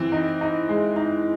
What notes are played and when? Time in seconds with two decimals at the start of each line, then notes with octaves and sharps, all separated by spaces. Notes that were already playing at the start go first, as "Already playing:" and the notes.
Already playing: E3 C4
0.12 D#4
0.41 D#4
0.69 G#3
0.96 D#4